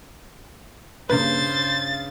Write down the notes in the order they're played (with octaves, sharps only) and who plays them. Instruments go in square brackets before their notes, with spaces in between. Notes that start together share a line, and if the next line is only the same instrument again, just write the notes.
[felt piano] G2 C#3 [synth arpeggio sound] A#3 B4 [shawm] C5 [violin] A6